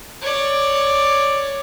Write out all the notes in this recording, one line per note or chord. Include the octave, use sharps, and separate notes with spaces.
C#5 D5